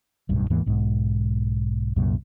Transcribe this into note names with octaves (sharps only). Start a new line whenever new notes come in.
D1 B1 G2
D#2 G#2 E3 A#3
B1 G#2
C2 F#2 A#2